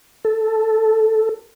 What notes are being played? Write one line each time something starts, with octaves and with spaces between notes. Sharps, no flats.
A4